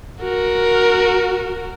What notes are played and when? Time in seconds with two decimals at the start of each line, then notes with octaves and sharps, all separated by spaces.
0.21 F#4 A#4